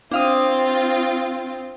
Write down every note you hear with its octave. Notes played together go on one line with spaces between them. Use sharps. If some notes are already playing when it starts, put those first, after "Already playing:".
C4 D4 F4 F5 D#6